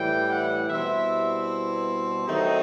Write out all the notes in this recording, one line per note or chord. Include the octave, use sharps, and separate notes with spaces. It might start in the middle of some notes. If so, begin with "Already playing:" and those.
Already playing: A2 E3 G3 G5
F#5
B2 G3 C4 E4 E5
D#3 F#3 A3 C4 D#4